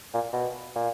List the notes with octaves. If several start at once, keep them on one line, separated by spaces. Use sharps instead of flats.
A#2
B2
A#2